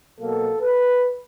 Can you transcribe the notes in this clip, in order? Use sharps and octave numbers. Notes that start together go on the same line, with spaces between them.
B2 F#3 A#3 A4
B4